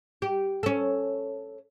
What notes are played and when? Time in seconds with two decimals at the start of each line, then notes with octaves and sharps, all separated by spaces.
0.22 G4
0.63 C#4 A4